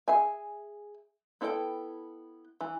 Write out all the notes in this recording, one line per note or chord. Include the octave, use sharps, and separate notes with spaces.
G#4 E5 G#5
B3 E4 A4 D5 G5
E3